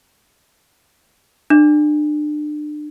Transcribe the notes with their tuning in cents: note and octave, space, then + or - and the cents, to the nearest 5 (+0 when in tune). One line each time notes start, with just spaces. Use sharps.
D4 +35